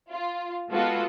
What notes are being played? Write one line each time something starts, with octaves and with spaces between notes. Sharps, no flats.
F4
G#3 B3 F4 F#4 A4